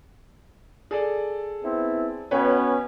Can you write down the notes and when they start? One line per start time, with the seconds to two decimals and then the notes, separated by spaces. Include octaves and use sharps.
0.91 G#4 A4 D5
1.63 B3 C4 E4
2.31 B2 B3 C#4 B4 C#5 G5